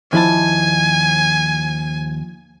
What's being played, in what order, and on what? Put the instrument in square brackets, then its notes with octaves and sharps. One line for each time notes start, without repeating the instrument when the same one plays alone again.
[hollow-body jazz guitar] D#2 E4 A5 [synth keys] F3 [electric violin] G#5